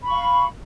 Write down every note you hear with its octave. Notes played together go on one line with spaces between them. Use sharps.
F5 B5 C#6